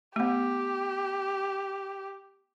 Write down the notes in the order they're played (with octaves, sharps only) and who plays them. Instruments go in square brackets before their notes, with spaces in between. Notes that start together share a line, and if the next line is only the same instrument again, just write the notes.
[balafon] A3 B3 [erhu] G4